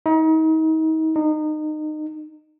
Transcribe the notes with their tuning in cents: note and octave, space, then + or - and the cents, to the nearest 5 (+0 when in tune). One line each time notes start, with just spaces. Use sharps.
D#4 +35
D#4 -25